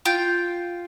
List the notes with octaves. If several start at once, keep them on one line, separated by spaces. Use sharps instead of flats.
F4 G5